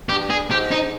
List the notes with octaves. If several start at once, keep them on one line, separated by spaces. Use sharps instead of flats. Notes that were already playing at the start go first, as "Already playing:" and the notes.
G2 G4
G#4
G#2 G4
D#4